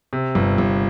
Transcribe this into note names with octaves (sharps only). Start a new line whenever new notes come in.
C3
G1
G1